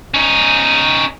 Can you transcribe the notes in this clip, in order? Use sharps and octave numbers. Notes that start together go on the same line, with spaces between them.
C#4 D#4